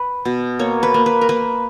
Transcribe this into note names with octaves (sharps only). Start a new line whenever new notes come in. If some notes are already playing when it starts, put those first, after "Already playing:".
Already playing: B4
B2
A#3 C#5
B4
A#3
B4
A#4
A#3 B4